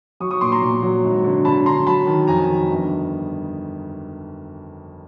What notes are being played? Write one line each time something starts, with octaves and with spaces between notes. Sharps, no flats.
F#3 C#6 D#6
C#6 D#6
A#2 C6 D6
A#5 C6
A#2
F#3
G#1
D3
D3 A5 B5
D3 A#5 C6
F#3 A5 B5
D#3
F2 G#5 A#5
D#3
G1